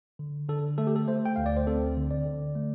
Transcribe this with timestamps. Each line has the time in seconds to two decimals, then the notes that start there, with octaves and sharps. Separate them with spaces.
0.19 D3
0.49 D3 A4
0.78 A3 A4
0.87 G4
0.96 A4
1.08 A3 C5
1.25 G5
1.36 D2 F5
1.46 D5
1.57 C5
1.67 C4 A4
1.97 D3
2.11 D5
2.26 D3
2.55 A3